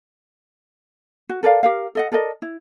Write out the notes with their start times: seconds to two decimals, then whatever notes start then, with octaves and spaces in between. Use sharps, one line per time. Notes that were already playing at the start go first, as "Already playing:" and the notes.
1.29 F#4
1.43 A4 A#4 D5 F5
1.63 G4 A#4 F5
1.95 A4 D#5 F#5
2.12 A4 A#4 D5 D#5
2.42 E4